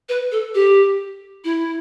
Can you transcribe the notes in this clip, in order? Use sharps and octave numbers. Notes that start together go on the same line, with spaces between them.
B4
A4
G4
E4